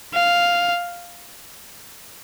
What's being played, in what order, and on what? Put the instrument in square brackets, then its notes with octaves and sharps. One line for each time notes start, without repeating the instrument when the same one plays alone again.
[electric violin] F5